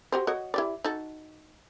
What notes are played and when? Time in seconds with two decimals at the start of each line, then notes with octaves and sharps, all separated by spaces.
0.12 F#4 G4 C5
0.27 F#4 C#5 D#5
0.54 E4 G4 D5
0.84 D#4 F#4 A4